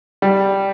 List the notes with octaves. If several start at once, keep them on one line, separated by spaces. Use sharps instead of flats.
G3